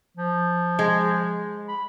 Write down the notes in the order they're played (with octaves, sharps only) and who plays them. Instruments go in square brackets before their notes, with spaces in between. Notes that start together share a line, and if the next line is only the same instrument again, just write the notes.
[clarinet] F3
[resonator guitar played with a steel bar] G#3
[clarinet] B5